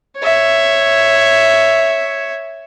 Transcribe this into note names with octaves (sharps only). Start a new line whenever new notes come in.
C#5 E5